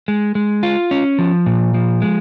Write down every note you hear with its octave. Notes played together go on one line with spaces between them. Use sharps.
G#3
G#3
F4
C#4
F3
A#2
F3
G#3